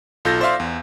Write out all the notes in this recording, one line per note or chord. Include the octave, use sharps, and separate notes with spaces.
B1 F4 A4 G6 A#6
C5 D5 E5 F5 C6
E2